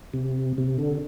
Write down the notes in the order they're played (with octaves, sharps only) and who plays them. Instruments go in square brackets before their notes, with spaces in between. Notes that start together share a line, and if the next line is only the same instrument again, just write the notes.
[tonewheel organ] C3
C3
D3